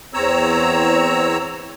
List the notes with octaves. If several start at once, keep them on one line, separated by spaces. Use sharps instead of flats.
E2 C4 C#5 A#5 E6